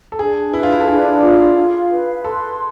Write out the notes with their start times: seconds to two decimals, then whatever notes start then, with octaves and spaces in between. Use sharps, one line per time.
0.12 A4
0.19 D4 G#4
0.53 E4 B4
0.63 F4
0.72 E4
0.80 A4
0.87 D4 G#4
1.22 F4
1.57 F5
1.91 B4
2.24 A4 C6